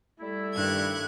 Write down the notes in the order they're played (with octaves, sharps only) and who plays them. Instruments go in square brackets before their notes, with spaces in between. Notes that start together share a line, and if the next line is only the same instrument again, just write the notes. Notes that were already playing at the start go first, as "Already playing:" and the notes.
[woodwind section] G3 E4 [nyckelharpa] A3
[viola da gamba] G2 D#3 [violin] F#6 G#6